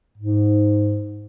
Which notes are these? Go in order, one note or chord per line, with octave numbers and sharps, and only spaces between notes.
G#2